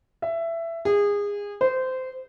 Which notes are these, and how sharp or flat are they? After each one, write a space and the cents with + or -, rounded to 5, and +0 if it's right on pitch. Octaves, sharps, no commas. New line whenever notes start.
E5 +15
G#4 -25
C5 -20